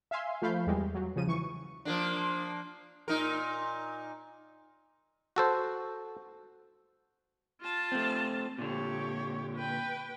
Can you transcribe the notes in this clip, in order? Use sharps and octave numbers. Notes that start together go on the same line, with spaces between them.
E5 F5 G#5 C6
F3 A3 F5 B5 G6
E2 G3 G#3
F#3
C#3 F3 D#7
E3 C#6
F3 A#3 D4
A#2 D#4 A#4
F#4 A4 C5
F4 A5
A3 C4
A#2 D3 G4 C#5
B4 G5